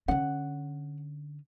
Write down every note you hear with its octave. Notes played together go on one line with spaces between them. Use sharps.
D3 C#4 F#5